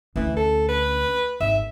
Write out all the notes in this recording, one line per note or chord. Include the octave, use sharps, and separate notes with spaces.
D2 E3 C#4
A4
B4
G#1 E5